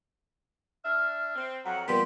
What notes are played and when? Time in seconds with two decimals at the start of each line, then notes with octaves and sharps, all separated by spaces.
0.85 D4 E5 F6
1.35 C4
1.65 F2 F#3 F#5 A#5
1.88 A#2 G3 B3 G4 C6 B6